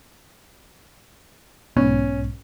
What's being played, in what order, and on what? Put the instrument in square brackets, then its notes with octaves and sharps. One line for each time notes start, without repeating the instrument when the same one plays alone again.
[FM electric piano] B1 G#2 [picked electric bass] B3 [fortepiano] C#4